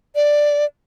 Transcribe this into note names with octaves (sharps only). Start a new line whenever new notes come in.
D5